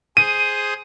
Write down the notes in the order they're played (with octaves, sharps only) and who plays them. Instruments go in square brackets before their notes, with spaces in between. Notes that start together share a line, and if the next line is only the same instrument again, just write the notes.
[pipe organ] G#4 C5 D#6 [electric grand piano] D#7